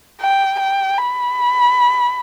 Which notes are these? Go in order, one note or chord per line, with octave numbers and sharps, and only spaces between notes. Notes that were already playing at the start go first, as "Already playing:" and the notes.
G5
G5
B5